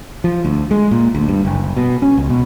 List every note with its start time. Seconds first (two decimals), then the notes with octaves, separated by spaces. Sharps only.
0.24 F3
0.45 D2
0.71 G#3
0.91 A#2
1.15 D2
1.28 G2
1.45 F#1
1.76 B2
2.02 C#4
2.18 C#2
2.29 B2